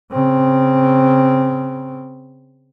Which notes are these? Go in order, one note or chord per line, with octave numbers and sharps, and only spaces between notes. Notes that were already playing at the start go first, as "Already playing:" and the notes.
C#3 C4